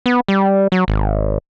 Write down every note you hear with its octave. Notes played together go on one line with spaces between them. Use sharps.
B3
G3
F#3
G#1